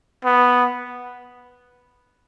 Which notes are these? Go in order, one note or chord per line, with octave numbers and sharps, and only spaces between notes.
B3